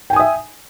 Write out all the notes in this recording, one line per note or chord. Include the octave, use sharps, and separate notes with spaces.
E5 G5 G#5 D#6